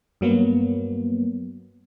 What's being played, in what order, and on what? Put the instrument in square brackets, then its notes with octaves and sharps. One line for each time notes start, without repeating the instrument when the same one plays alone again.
[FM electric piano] G2 F#3 A#3 B3